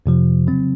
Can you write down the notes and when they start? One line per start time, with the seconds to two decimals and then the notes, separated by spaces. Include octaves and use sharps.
0.06 F2 C3 F3
0.47 C#3 F#3 C4